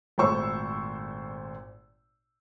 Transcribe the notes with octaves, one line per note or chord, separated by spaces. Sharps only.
G#1 A#2 A3 C5 C#6 E6